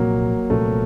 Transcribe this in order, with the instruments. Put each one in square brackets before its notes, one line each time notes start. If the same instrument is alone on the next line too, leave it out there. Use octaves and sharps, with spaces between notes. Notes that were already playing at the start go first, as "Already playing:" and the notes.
Already playing: [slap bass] C2 A#2 F3 C4 [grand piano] F#3 A#3
[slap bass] C2 A#2 F3 C4 [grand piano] A3